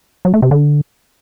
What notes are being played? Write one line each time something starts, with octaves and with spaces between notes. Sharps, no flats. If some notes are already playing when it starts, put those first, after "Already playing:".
F#3
A3
C3
D3